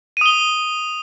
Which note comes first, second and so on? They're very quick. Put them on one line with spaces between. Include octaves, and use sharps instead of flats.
D#7 D#6 G7